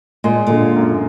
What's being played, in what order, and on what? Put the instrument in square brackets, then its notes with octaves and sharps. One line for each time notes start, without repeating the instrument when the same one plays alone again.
[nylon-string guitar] A#2 [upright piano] G#3
[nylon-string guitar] A#2 [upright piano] D3
[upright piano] F#2